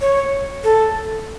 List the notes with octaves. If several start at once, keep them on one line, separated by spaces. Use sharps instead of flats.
C#5
A4